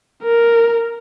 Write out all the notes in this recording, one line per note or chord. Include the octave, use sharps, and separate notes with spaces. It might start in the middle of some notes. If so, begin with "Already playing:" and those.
A#4